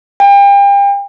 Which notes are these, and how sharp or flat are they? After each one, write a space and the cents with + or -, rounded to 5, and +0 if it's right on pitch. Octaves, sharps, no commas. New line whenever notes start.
G5 +35